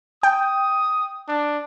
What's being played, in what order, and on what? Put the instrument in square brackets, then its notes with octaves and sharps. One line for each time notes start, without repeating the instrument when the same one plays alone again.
[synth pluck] G5 [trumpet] D#6
[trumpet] D4